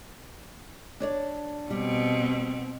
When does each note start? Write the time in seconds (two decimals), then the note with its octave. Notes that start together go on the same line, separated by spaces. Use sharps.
1.00 D4 C#5 D5
1.71 B2 G3 C4